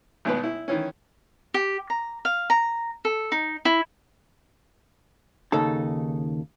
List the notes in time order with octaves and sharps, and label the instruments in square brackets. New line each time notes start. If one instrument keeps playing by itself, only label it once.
[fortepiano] G#1 B2 B4
E4
D#3 E3 C#4
[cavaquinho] G4
A#5
F5
A#5
A4
D#4
E4
[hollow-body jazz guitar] D#2 C#3 D#4 A4 A5